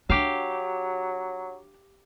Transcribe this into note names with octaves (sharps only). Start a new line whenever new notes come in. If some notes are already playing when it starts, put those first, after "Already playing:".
F#3 D4 G4 F5